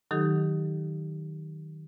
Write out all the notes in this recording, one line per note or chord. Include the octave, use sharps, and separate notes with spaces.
D#3 F#3 D#4 G4 A4